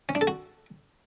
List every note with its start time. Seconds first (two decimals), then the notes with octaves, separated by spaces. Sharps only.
0.09 C#4
0.15 D4
0.21 A4
0.27 F#4